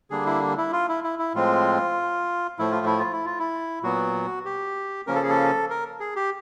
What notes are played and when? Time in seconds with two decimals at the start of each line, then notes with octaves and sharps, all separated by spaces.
0.10 D3 G3 A#3 D4 G#4
0.26 E4
0.57 E4
0.72 F4
0.89 E4
1.04 E4
1.19 E4
1.34 A2 F3 G#3 C4 F4
2.59 A2 F3 A3 E4
2.72 F4
2.86 E4
2.99 F4
3.12 E4
3.26 F4
3.39 E4
3.83 A#2 F#3 B3 F#4
4.45 G4
5.07 C#3 F3 A#3 C#4 A#4
5.15 A4
5.23 G#4
5.29 A4
5.70 A#4
6.00 G#4
6.16 G4